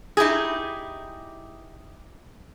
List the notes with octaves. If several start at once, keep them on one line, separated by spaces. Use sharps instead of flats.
D#4 E4 G4 G#4